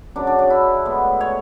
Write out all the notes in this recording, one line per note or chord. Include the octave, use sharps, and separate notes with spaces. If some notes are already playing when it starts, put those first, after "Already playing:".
F#2 C#3 F#3 D4
D4
D4
E4
A2 G#3 B3
C#5